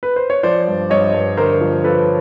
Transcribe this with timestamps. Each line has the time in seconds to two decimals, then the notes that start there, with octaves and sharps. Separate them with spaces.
0.03 B4
0.16 C5
0.30 C#5
0.43 F3 C5 D5
0.67 G2
0.90 G2 C#5 D#5
1.14 G2
1.37 D3 A#4 C5
1.61 F3
1.84 F3 A4 B4